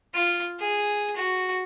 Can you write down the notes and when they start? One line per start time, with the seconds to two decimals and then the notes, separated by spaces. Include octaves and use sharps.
0.14 F4
0.60 G#4
1.16 F#4